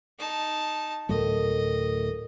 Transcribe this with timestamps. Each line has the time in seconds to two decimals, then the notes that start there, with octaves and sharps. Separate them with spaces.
0.19 D#4 A5
1.09 D2 A2 F#3 A4 A#4 D#5